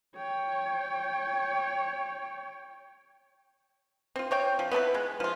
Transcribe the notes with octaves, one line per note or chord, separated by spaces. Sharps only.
C#5 G5
C4 F4
C4 C#5 G5
F3
B3 E4 A4 B4
G#3
F3 F4